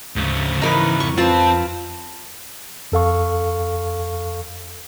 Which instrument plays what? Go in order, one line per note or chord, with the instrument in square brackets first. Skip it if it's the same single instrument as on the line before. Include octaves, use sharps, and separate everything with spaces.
[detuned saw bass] D2 [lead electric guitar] G#2 C#3
[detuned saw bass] E3 [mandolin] D#4 B4 [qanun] E4 A#4 D5
[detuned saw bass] F2 [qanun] C#6
[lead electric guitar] C4 [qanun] F4 B4 [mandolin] A5
[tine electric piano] F2 A4 F5 C#6